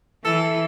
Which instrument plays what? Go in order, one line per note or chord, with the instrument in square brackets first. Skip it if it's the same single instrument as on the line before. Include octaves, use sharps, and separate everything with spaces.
[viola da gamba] E3 [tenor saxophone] A4